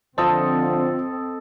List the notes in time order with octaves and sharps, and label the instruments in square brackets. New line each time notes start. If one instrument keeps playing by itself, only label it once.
[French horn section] D3 F3 [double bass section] C4 [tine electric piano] F4 C5 [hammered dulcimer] A4 D#5